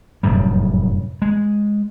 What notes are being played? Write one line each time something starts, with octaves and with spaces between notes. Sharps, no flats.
F1 F#2 A2 G3
G#3